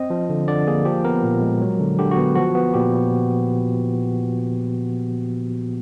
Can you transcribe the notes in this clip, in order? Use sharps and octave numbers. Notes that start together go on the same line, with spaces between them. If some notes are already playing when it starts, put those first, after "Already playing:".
Already playing: C4 D#5
F3
D3
D3 D5
A#3 G#4
F3 G4
B3 A#4
A#2
G#3
F#3
D3
D3 G4
F#4
B3
F3 F#4
B3
A#2 G4